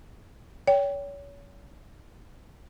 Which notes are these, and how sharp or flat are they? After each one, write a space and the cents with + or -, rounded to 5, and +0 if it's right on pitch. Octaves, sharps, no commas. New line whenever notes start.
C#5 +30 G5 +0